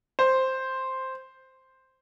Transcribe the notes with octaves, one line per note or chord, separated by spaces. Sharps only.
C5